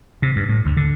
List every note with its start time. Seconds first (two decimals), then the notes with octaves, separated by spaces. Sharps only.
0.22 C3
0.36 G2
0.49 A2
0.65 D2
0.77 D3